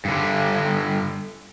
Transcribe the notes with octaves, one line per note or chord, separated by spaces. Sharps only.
G2 D3